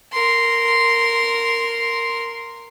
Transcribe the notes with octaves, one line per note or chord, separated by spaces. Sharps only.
A#4 C6